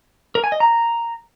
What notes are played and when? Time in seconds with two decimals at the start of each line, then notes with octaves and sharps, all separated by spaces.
0.35 A#4
0.44 G#5
0.52 D#5
0.60 A#5